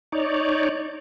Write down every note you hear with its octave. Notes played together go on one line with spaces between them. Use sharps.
D#4 C#5 D5